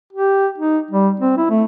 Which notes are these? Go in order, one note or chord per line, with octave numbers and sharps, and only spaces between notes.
G4
D#4
G3
C4
E4
A3